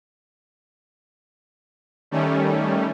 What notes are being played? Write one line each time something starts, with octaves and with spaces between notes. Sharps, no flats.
D#3 G3 A3 C#4